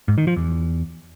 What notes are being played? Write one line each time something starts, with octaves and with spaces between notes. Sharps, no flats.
G#2
D#3
F3
E2